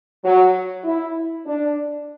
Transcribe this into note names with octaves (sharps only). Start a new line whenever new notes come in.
F#3
E4
D4